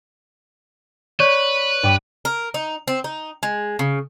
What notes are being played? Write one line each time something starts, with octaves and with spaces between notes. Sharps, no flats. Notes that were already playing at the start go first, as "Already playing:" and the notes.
B4 C#5 D5 C#6
G2 G5 D6
A#4
D#4
C4
D#4
G#3
C#3